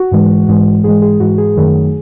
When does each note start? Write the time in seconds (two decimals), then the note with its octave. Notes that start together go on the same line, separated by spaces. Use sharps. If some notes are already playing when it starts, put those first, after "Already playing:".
Already playing: F#4
0.12 G#2 E3 G#3
0.48 G#2 E3 G#3
0.84 G#2 E3 G#3 G#4
1.02 G#4
1.20 G#2 E3 G#3 F#4
1.38 G#4
1.56 F#2 D#3 F#3 A3